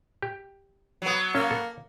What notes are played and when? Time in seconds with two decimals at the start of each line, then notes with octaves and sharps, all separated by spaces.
0.22 G4
1.02 F#3 B3
1.35 A#3 C#4
1.51 A4